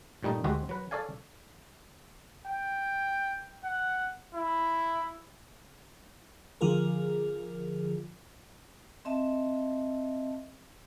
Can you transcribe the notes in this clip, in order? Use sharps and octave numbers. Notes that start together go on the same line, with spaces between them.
G2 A#2 G3 A3 D#4
D2 G#3 F#4 G4 C5 E5
F#3 B4
A4 C#5 D5 F5 G#5
G5
F#5
E4
D3 F3 F4 G#4 A#4
C4 D#5 E5 A5